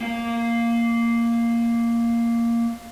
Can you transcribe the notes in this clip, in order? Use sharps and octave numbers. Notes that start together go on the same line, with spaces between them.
A#3 F5